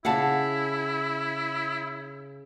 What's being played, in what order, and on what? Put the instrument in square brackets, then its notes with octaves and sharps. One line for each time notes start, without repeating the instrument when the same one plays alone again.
[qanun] C#3 F5 D6 [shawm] E4 [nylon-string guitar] F#5 A5